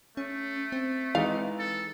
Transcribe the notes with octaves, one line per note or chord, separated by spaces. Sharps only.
A3 C#4
C4
E3 G#3 D#4 F5
A4